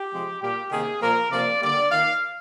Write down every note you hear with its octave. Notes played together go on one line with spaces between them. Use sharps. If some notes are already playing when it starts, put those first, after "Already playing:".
Already playing: G4
C3 F3 G#3
A#2 G3 A#3 G4
C3 D#3 A#3 G#4
A#2 F3 A#3 A#4
C3 F3 A#3 D5
D3 G3 A#3 D5
D#3 A#3 F5